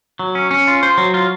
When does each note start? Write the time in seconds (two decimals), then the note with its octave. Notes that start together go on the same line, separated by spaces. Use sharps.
0.19 F#3
0.35 C#4
0.51 C#4
0.68 F4
0.83 C5
0.98 F#3
1.14 F4